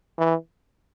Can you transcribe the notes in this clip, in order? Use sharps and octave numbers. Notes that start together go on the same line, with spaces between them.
E3